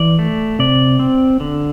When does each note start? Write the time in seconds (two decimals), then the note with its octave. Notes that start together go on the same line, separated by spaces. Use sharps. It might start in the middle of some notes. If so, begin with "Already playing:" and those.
Already playing: E3 D5
0.19 A3
0.59 C3 D5
0.99 C4
1.40 D3